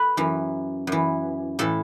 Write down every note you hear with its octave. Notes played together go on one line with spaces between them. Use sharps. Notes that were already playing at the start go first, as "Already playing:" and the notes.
Already playing: A4 B4
F#2 E3
F#2 E3
A2 E3 A4